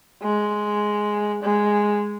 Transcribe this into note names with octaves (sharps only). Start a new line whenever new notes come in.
G#3
G#3